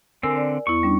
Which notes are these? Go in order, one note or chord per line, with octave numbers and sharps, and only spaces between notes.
D3 C4 A#4 G#5 E6
D5
E2 B3 E4 C#6
G3 C#4 D4